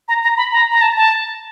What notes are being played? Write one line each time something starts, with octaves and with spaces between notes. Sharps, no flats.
A#5
A#5
B5
A#5
A#5
A5
A5